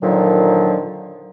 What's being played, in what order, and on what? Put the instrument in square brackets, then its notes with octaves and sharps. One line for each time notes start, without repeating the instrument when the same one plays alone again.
[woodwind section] A#2 D3 D#3 F3 F#3